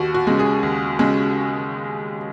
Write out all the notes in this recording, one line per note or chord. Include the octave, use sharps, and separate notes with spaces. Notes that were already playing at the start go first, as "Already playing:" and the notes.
Already playing: D#2 F#4
F#4
C#3 G#3
G#4
D#2
C#3 G#3